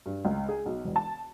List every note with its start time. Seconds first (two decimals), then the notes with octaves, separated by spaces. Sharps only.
0.06 G2
0.25 C#2
0.49 G#4
0.66 B1
0.84 E1
0.96 A5